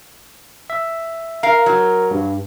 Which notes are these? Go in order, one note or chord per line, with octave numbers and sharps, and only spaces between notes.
E5
A#4 F5
F#3
G2